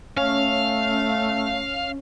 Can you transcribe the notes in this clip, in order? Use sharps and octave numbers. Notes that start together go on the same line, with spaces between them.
A3 C#4 F5